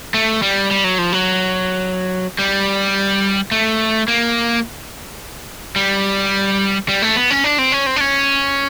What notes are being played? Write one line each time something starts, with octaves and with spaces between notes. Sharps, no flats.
A3
G3
G3
F#3
F3
F#3
G3
A3
A#3
G3
G3
A3
B3
C#4
D4
C4
C#4
C4
D4
C#4